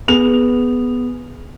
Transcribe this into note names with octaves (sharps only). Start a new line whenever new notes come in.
B3 G#4 F7